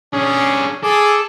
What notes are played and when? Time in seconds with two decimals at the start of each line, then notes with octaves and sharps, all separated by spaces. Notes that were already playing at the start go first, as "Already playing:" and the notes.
0.13 C#4 D4 G#4
0.83 G#4 A4 D6